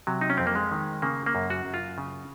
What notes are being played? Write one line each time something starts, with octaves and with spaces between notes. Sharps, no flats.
C3 F#3
D#4
C#4
F2 C4
A#3
G#3
D#3
C#3 A#3
A#3
F#2
F#4
F#2
F4
C#3